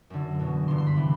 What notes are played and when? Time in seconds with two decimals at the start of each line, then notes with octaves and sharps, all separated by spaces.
0.10 F#2 D3
0.39 E2 B2
0.68 G2 D3 C6
0.78 C6
0.87 B5
0.96 C3 E3